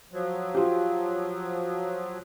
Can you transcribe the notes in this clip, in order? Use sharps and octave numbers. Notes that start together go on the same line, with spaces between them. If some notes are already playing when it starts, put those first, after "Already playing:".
F3 F#3
F4 G4